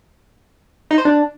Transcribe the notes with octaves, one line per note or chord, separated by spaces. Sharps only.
D#4
C5
D4